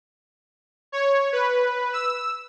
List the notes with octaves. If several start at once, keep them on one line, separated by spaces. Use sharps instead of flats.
C#5
B4
E6